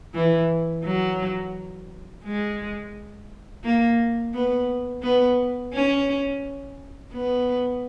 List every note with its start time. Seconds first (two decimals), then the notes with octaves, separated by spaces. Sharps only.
0.14 E3
0.84 F#3
2.24 G#3
3.64 A#3
4.34 B3
5.03 B3
5.73 C#4
7.12 B3